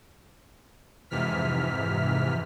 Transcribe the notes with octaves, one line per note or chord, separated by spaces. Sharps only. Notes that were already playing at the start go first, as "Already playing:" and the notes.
F2 G#2 C3 E3 F6 B6